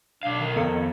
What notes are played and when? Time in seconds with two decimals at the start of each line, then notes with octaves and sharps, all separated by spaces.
0.23 B1 D4 F5
0.40 D#3
0.56 C2 F2 B3 A4 C#7